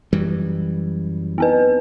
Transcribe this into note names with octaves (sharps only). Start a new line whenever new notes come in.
F#2 E3 G3
B3 C4 B4